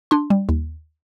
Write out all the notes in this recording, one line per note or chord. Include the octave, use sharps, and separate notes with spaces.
D4 C6
G3
D#2